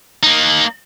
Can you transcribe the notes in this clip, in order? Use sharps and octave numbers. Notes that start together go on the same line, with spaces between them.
A#3 D#4